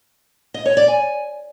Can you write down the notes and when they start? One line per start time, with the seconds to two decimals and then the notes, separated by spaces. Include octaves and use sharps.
0.54 D#5
0.66 C#5
0.77 D5
0.88 G#5